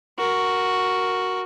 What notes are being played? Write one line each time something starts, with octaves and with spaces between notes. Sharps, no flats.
F#4 A#4